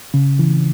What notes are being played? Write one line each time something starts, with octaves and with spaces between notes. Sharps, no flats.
C#3
E3